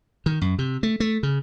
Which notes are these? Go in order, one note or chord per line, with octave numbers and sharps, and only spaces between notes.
D#3
F#2
C3
A3
A3
C#3